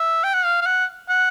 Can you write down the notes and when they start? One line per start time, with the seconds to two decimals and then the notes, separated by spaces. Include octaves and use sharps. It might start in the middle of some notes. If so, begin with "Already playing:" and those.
Already playing: E5
0.24 G5
0.34 F#5
0.45 F5
0.62 F5
0.66 F#5
1.09 F#5